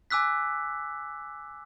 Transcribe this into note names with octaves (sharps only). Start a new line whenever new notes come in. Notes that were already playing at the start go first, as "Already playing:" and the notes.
G#5 D6 E6 F#6 B6